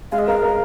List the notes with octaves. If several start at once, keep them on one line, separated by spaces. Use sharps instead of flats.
G#3 F5
D#5
A#4 F5
A#4